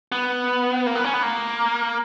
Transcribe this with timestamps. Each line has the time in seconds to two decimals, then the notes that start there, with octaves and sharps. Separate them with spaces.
0.12 B3
0.87 A#3
0.95 B3
1.04 C#4
1.14 B3
1.23 A#3